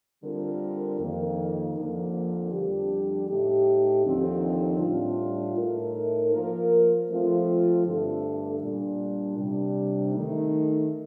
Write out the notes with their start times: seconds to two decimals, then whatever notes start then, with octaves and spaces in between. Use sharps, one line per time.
0.23 D3 G3 C4 F4 A#4
0.99 F2 D#3 A#3
1.76 F2 D3 F3 A#3
2.52 F2 D3 G3 D4 G4
3.28 A2 A3 D#4 G4
4.05 D#2 D3 F3 C4 D#4
4.80 A2 G3 D4 F4
5.57 A2 A3 D#4 A#4
6.32 F3 A#3 F4 A#4
7.09 F3 A3 C4 F4
7.85 G2 D3 A3 D4 A4
8.61 A#2 G3 D4
9.37 C3 G3 D4
10.13 D#3 A3 D#4